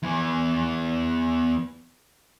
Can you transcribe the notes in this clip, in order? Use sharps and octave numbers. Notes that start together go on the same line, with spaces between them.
E2 E3